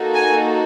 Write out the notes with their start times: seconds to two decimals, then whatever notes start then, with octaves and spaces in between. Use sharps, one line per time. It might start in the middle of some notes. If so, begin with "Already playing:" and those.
Already playing: A#3 D#4 F#4 A4
0.14 G#5